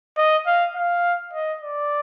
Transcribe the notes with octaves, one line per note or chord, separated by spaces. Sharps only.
D#5
F5
F5
D#5
D5